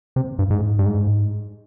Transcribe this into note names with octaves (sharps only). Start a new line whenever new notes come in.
C3
G2
G#2
G2
G#2